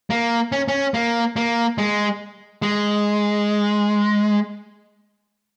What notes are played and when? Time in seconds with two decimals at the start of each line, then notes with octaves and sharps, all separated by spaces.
0.10 A#3
0.52 C#4
0.68 C#4
0.94 A#3
1.36 A#3
1.78 G#3
2.62 G#3